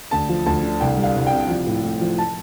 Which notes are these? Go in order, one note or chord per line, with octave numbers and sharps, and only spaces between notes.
D2 A5
F3
D2 A5
D3
C2 G5
G3
F5
C2
G5
C3
F3
A2
A2
F3
A5